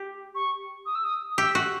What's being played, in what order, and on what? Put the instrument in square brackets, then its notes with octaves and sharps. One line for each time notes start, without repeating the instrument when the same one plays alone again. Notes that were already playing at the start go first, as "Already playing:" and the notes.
Already playing: [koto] G4
[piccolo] C#6
D#6
E6
D#6
D#6
[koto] G4 [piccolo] E6
[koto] F#4